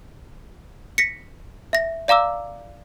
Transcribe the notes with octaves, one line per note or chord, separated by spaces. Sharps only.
A#6 B6 C#7
E5 A#6
D5 F5 A#5 D6 E6